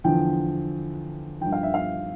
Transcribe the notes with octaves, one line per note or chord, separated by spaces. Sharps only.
E2 D3 F3 G5
G2 F3 G5
F5
E5
F5